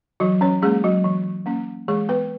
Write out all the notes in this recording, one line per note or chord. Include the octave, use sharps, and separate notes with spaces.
E3 F#3 F#4
C#4 C#5
G#3 A#3 C#4 G#4
F#3 F#4
E3
A#3 C#4
E3 G#3 G#4
B3 B4